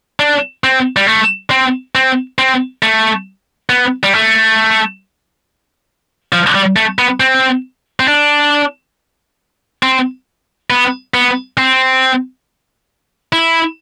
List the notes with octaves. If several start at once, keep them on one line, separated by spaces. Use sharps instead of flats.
D4
C4
G3
A3
C4
C4
C4
A3
B3
G3
A3
F3
G3
A3
B3
C4
C4
D4
C4
B3
B3
C4
E4